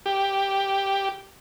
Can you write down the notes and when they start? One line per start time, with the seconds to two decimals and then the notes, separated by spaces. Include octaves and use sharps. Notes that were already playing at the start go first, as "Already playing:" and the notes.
0.06 G4